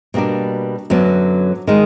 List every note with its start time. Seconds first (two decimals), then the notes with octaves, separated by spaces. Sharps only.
0.14 B2 G3 A#3 D4
0.90 F#2 D3 F#3 B3
1.67 D#3 G#3